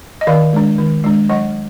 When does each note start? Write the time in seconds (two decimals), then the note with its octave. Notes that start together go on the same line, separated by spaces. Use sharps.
0.21 D#5
0.27 D#3 D5 F5
0.53 G#3 D4
0.78 D#3
1.04 G#3 D4
1.29 F#3 D#5 F#5